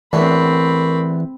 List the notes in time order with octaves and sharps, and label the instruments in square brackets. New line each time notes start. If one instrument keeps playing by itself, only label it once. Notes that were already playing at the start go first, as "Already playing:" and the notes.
[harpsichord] E2 A2 D3 [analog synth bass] E3 [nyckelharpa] C4 B5 [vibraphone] A#4 C#6